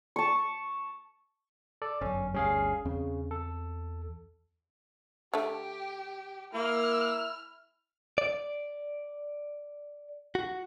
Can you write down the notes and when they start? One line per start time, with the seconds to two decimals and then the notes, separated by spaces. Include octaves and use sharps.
0.16 A5 C#6
1.82 A4 D5
2.01 G1 F#2 C#4
2.34 G1 D2 G3 C#4 G#4 F5
2.85 E2 C#3 C4
3.31 A4
5.34 D3 A3 G4
6.54 A#3 E4 F6
8.18 D5
10.35 F#4